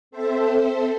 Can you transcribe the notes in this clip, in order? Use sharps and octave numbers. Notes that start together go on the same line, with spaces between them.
C4 A4 C5 E5